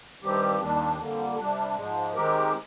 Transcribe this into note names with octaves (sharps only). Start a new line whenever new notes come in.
G2 D#3 G3 C4 G4
D#2 D#3 G3 D4
F2 D3 G3 A#3
C3 G3 D4
G#2 F3 G#3
D#3 G#3 C4 G4 A#4